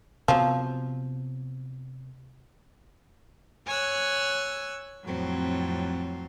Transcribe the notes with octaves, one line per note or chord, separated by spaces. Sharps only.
C3 F3 F#3 B3
C#5 G#5 E6 F#6
F2 A2 F#3 C4